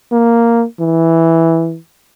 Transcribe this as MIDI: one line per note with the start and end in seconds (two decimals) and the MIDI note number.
0.12 0.65 58
0.80 1.77 52